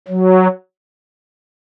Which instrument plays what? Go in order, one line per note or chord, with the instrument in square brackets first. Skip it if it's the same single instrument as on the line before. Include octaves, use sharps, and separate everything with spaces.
[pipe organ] F#3